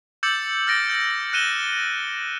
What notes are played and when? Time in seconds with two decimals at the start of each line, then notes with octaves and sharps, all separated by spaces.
0.23 D6 E6 G6 A6 C#7 F#7
0.67 F6 A6 A#6 D7
0.89 G6
1.33 F#6 C#7 D#7 E7 G7